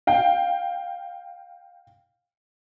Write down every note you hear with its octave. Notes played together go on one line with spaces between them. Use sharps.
F5 G5